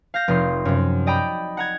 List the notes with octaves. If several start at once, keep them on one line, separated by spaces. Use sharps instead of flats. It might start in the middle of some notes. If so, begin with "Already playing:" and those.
F5 G6 A#6
F1 D#4 C6
F#2 C3
D5 D#5 G5 A#5 B5
F#5 A#5 G#6